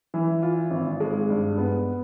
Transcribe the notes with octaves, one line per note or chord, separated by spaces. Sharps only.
E3
F4
G#1
G#3
G2
B3